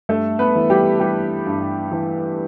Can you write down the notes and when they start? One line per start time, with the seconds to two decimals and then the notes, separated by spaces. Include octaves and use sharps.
0.09 G2 A3 A4
0.39 B3 B4
0.55 E3
0.70 G3 G4
1.00 E3 G3 G4
1.46 G2
1.92 E3